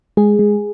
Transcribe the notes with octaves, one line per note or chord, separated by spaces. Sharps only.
G#3 G#4
G#3